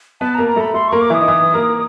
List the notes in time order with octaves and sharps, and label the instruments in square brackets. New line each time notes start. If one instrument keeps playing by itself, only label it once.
[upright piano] B3 B4 [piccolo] A5
[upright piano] A#3 A#4 [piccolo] A#5
[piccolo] A#5
[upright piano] A3 A4 [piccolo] B5
[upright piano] A3 A4 [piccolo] C6
[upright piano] A#3 A#4 [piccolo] C#6
[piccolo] D6
[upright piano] E3 E4 [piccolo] D#6
[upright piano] D#4
E3 E4
A#3 A#4